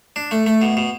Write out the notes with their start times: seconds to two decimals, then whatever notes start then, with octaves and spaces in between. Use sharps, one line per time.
0.16 D4
0.31 A3
0.46 A3
0.62 B2
0.77 B2